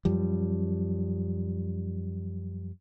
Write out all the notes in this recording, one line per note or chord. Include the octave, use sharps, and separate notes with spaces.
F#2 F3 G3